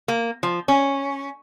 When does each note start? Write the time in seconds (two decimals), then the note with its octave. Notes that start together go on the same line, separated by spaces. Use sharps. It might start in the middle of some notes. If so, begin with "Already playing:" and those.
0.08 A#3
0.43 F3
0.68 C#4